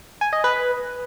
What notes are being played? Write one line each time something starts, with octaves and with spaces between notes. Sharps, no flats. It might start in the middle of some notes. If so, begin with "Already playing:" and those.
G#5
D#5
B4